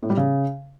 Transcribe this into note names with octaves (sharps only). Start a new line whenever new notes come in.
A2
G3
C#3